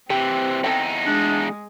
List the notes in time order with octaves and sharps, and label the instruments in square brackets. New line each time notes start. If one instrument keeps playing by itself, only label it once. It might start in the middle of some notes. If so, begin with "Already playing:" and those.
[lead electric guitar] C3 E3 [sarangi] C4 [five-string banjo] G4
[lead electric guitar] E2 D#4 [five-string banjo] A4 G5
[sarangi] G#3 [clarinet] D4